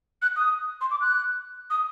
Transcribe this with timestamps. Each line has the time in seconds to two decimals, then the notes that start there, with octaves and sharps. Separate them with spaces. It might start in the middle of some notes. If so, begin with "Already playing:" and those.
0.22 F#6
0.36 D#6
0.81 C6
0.91 D6
1.01 F#6
1.70 D#6